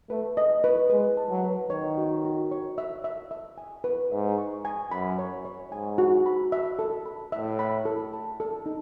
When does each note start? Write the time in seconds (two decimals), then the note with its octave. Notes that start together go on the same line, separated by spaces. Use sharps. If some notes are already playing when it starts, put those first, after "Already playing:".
0.10 A3 B4
0.37 D#5
0.64 B4
0.90 G#3 B4
1.17 A5
1.30 F#3
1.44 B4
1.70 D#3 C#5
1.98 F#4
2.25 F#4
2.51 C#5
2.78 E5
3.04 E5
3.31 E5
3.58 G#5
3.84 B4
4.12 G#2 E5
4.38 C#6
4.65 G#5
4.91 F#2 B5
5.19 C#5
5.45 C#5
5.72 G#2 G#5
5.98 F#4
6.26 B5
6.52 E5
6.79 A4
7.06 B5
7.32 A2 E5
7.59 B5
7.85 A4
8.13 A5
8.40 A4
8.66 D#4